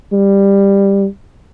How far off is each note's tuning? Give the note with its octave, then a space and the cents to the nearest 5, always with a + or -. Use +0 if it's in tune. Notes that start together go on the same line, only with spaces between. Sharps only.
G3 +10